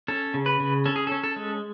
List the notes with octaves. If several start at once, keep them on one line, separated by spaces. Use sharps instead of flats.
C#4 A4
C#3
B4
C#3
C#4 A4
G#4
C#4 A4
A4
G#3